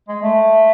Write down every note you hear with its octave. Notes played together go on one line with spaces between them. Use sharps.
G#3
A3